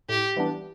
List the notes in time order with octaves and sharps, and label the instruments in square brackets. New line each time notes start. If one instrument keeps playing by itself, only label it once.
[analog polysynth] A2 [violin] G4
[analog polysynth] E3 G3 B3 D4